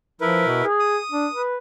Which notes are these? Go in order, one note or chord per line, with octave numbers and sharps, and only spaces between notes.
F3 E4 A#4 B4
B2
G#4
D#6
D4
B4